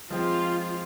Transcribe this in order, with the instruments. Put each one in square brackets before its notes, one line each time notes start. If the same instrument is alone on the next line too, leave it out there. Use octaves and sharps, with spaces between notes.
[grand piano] F3 G#3 C4 [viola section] F4